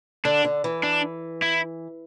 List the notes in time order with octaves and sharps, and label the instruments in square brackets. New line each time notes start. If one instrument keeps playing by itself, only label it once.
[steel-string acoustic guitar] D3 [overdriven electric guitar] D4
[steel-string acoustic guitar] D3
E3
[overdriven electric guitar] D4
E4